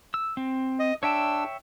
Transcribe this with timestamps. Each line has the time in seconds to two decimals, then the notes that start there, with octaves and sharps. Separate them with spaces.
0.14 E6
0.37 C4
0.80 D#5
1.03 D4 C#5 E5 G5 E6